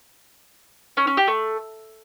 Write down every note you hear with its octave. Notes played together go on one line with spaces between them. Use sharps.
C#4
C#4
G4
A3